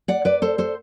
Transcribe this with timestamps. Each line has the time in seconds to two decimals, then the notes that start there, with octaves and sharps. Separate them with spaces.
0.08 D5 F#5
0.25 B4 D5
0.42 A4 C5
0.58 A4 C5